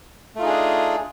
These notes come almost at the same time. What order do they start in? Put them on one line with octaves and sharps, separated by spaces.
A3 F4 D#4 G#4 D4